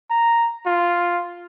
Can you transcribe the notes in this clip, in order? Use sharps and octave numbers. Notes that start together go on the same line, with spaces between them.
A#5
F4